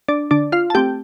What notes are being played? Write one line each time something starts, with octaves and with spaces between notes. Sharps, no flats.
D4 D5
D3 D4 D5
F4 F5
A5
A3 C4 G4 G5